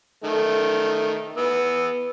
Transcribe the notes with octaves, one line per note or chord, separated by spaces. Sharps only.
D#3 A3
B3 E6